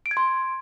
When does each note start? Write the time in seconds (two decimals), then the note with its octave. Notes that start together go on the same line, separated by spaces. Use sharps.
0.06 D7
0.11 G#6
0.17 C6